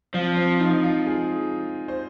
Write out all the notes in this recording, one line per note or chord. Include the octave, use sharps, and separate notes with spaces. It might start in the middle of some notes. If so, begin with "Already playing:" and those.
F3 C4
C4
D#4
F4
G#4
C5